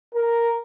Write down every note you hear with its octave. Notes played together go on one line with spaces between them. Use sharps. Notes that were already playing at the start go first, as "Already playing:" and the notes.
A#4